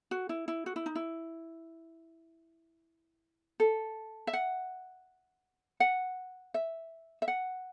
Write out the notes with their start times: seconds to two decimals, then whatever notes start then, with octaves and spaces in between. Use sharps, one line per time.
0.11 F#4
0.29 E4
0.48 E4
0.66 F#4
0.76 E4
0.86 D#4
0.96 E4
3.60 A4
4.27 E5
4.33 F#5
5.80 F#5
6.54 E5
7.22 E5
7.28 F#5